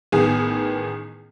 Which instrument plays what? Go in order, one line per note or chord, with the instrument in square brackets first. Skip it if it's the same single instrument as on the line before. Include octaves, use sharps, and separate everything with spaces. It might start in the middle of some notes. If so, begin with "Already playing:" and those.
[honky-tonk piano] A1 D#3 B3 G#4